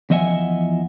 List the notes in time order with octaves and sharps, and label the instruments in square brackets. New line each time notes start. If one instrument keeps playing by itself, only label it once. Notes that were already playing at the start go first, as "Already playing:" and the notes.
[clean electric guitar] E2 F3 D#5 E5 F#5 G#5